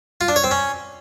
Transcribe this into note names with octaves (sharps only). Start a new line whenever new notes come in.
F4
D4
C#5
C4
C#4